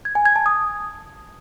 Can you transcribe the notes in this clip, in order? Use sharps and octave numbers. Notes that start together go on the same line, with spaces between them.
G#6
G#5
G#6
A5
D#6